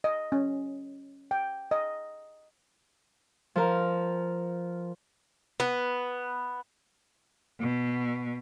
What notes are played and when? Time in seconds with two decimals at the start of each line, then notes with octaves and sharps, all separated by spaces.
0.04 D#5
0.32 C#4
1.31 G5
1.71 D#5
3.56 F3 A#4
5.60 B3
7.60 B2